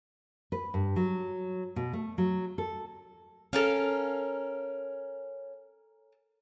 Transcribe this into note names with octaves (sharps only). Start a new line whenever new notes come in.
B4
G2
F#3
B2
A3
F#3
A4
C#4 A4 A#4 F5